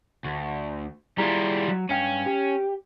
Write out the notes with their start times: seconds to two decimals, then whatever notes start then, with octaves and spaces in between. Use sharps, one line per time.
0.24 D2
1.18 G3 E4 F4 G#4 A#5
1.68 F#3
1.90 G2 C#4 F5 G5
2.26 G4